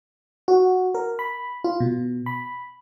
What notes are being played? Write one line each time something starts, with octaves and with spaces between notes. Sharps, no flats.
F#4
A#4
B5
F4
B2
B5